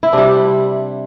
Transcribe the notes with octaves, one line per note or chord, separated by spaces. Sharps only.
E4
C3 G3 D4